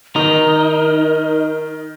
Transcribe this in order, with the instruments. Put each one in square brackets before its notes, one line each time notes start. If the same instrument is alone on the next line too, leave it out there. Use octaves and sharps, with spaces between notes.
[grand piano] D#3 [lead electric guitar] D#4 [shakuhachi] A#4